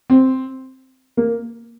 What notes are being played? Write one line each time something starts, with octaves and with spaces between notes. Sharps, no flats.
C4
A#3